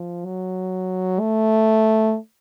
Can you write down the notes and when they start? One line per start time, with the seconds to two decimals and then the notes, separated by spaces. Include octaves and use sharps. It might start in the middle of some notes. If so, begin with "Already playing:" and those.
Already playing: F3
0.25 F#3
1.20 A3